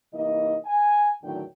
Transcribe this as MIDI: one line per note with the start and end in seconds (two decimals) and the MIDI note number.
0.14 0.57 48
0.14 0.57 52
0.14 0.57 58
0.14 0.57 63
0.14 0.57 75
0.65 1.10 80
1.23 1.43 40
1.23 1.43 45
1.23 1.43 50
1.23 1.43 51
1.23 1.43 54
1.23 1.43 79